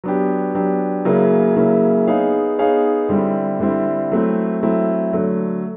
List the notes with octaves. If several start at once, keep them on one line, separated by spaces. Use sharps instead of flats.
F#3 B3 D4 G4
F#3 B3 D4 G4
C#3 F#3 A#3 C#4 E4
C#3 F#3 A#3 C#4 E4
B3 D#4 G#4 C#5 F5
B3 D#4 G#4 C#5 F5
D3 G3 C4 E4
D3 G3 C4 E4
F#3 A3 C4 E4
F#3 A3 C4 E4
D3 F#3 A3